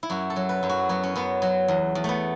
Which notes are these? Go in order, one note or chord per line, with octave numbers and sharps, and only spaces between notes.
E4
F#2 F#4
A4
F#3
B4
F#2
F#4
F#3 B3
C#4
F#2 B3
F#3
E2
E2
A3 B3